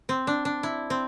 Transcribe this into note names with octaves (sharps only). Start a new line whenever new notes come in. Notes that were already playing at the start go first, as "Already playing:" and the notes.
C4
D4
D4
E4
C4